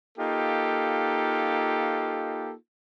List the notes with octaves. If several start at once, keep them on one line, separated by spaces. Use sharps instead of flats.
A#3 D#4 F4 G4 A4